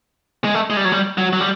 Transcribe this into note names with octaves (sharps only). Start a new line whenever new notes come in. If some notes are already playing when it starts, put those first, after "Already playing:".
G#3
A3
G#3
G3
F#3
G3
F#3
F#3
G3